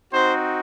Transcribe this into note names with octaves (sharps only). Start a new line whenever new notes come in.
C4 D#4 F#4 C5